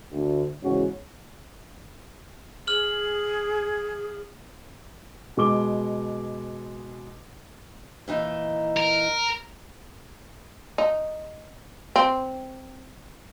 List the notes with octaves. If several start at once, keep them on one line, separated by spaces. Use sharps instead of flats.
D2
E2 G#2 C#3 C#4 F#4
G#4 F6 F#7
B2 G#3 D6 G7
A#2 E3 D#4
A#4
D#4
C4